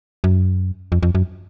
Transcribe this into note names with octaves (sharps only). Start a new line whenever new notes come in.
F#2
F2
F2
F#2